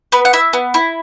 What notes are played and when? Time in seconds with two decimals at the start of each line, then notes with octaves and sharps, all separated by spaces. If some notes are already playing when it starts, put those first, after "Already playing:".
0.12 B3 B4
0.25 F#5
0.33 E4 E5
0.53 B3
0.74 E4